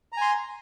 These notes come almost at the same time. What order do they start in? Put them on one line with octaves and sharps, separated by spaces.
A#5 G#5 C6